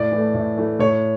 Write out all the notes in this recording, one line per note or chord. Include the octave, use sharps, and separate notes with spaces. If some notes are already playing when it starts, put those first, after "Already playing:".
Already playing: A2 D5
E3 A3
A2
E3 A3
A2 C#5